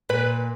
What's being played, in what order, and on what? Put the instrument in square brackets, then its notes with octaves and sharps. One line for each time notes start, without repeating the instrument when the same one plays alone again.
[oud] A#2 [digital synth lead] B4